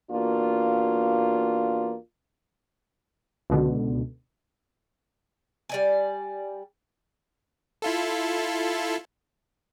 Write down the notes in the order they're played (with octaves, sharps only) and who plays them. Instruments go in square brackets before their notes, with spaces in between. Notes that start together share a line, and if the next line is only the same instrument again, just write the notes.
[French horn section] E2 A#3 D4 F4 F#4
[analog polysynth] C#2 B2 D3
[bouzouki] G3 D5 G#5
[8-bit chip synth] E4 F4 A4